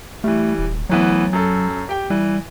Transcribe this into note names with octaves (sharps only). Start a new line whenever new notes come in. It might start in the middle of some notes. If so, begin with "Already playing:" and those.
E3 G3 A3
D#1
D2 E3 F#3 B3
F#2 A4
G4 G5
E3 G3